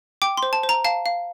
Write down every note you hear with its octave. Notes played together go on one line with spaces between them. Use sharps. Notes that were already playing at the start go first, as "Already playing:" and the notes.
G5 D6
C6
C5
A5
C5
A#5
F5 A5
F5